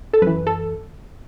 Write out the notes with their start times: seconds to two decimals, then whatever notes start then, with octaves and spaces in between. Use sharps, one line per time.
0.13 A4
0.22 F#2 E3 B4
0.47 A4